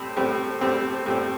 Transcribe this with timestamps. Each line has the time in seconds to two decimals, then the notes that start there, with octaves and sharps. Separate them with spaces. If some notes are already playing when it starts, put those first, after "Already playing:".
Already playing: A2 G3 C4
0.17 A2 G3 C4
0.61 A2 G3 C4
1.06 A2 G3 C4